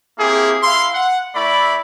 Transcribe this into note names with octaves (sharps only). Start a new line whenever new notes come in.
A#3 C4 E4 G4 G#4
E4 F5 C6
F#5
A3 E4 D5 B5